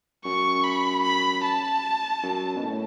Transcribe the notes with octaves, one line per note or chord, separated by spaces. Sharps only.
F#2 C#6
B5
B5
A5
F#2
B2
A2